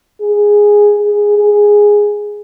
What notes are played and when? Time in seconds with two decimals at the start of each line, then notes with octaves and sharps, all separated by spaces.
0.21 G#4
0.98 G#4
1.37 G#4